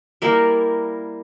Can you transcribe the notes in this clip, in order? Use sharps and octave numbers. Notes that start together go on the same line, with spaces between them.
G3 A#3 E4 A#4